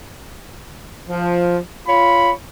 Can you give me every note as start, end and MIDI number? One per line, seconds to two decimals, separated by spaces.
1.09 1.59 53
1.88 2.31 65
1.88 2.31 73
1.88 2.31 83